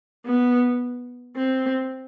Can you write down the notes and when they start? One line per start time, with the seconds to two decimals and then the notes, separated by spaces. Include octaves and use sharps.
0.25 B3
1.36 C4